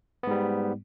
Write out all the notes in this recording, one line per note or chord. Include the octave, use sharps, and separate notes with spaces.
G#2 G3 B3